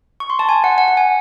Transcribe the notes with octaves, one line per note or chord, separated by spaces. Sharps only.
C#6
C6
A5
G#5
F#5
F#5
F#5
G#5